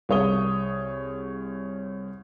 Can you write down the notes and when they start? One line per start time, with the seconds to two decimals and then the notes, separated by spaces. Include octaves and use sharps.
0.09 C2 G#4 C#5 D#6 G7